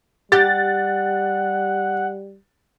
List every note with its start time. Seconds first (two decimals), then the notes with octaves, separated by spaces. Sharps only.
0.32 G3 G4 F#5 A6